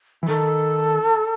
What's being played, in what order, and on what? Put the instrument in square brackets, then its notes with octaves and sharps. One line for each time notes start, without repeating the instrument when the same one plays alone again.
[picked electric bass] E3
[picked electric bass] D#3 [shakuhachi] A4